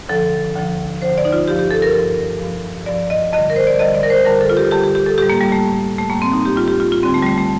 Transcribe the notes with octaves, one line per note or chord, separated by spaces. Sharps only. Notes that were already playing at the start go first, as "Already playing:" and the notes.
D2 D3 F3 A4
D2 D3 F3
D2 D3 F3 C5
D5
D#4
F4
G2 F3 G4
G4
A4
A#4
G2 F3
G2 F3
G2 F3 D5
D#5
F2 D3 G3 D#5
A#4
C5
D5
F2 D3 G3 D#5
D5
A#4
C5
F2 D3 G3 A#4
A4
F4
G4
F2 D3 G3 G4
G4
G4
A4
A2 G3 G4
A#3
G3
A3
A2 G3
A3
A2 G3 A#3
C4
D#4
G4
A2 G3 F4
G4
F4
F4
D#2 D3 G3 C4
A3
G3
A3
A3